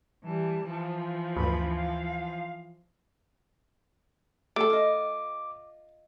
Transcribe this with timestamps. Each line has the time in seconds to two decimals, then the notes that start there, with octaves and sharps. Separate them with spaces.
0.24 E3 G3 A5
0.65 E3 F3
1.36 D2 G2 B5
1.76 F5
4.56 A3 A4 D6
4.70 F4 D#5